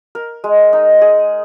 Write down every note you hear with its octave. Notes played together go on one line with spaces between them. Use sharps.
A#4
G#3
D#4
G#4